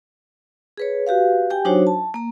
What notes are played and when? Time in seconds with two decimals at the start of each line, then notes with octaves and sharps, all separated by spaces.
0.78 G#4 B4 C#5
1.07 F#4 G4 B4 F5
1.50 G4 G5 G#5
1.65 F#3 D4 D#4 F#4 C5 C#5
1.87 A5
2.14 A#3 A#5